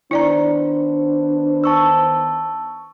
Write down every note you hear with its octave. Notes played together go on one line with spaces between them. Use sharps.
D#3 B3 D4 E4 C5 D5 A#5
A5 C#6 E6